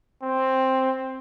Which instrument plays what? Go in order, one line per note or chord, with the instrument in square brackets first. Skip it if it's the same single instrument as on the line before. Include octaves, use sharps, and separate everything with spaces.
[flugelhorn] C4